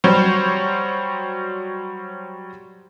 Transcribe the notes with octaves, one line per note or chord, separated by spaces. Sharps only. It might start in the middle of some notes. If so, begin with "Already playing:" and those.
F#3 G3 C5 C#5